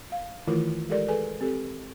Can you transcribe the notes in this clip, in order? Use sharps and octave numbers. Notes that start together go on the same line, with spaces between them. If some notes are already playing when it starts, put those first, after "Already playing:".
F5
D#3 E3 A3 E4 F4 A#4
G#3 G4 A4 A#4 D5
G#4 A4 B4 G#5
C4 G4 A4